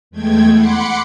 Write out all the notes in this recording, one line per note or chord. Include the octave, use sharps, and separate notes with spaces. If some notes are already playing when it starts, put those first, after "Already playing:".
E2 G#3 A3 G5 G#6
F#5 B5 C6 D6 C#7